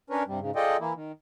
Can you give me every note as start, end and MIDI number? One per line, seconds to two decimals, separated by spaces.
0.10 0.23 61
0.10 0.23 62
0.10 0.23 70
0.10 0.23 71
0.10 0.23 73
0.27 0.40 43
0.27 0.40 48
0.27 0.40 55
0.40 0.51 44
0.40 0.51 49
0.56 0.77 65
0.56 0.77 68
0.56 0.77 69
0.56 0.77 74
0.56 0.77 75
0.56 0.77 79
0.80 0.93 52
0.80 0.93 58
0.80 0.93 64
0.95 1.12 51